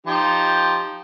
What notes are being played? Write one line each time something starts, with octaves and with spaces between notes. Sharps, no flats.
F3 D#4 G4